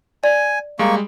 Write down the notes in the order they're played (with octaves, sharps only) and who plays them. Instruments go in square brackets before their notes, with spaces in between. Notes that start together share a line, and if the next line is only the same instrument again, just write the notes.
[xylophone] D5 [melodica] G#5
[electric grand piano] G3 G#3 [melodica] A#3 C#6